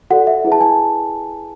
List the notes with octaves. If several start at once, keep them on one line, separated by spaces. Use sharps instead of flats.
F#4 A4 D5 F#5
E5
E4 G#4 B4
A5
G#5